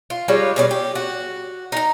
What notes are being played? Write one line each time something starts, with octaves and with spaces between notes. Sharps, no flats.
F4
G3 G#3 F4 C#5
B2 C#4 D5
G4
F#4
D#4 A#5